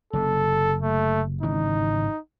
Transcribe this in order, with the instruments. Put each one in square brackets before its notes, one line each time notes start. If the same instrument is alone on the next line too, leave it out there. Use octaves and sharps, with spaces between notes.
[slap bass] F#1 C3 [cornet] A4
[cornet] A3
[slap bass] G#1 C#3 E3 [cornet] D#4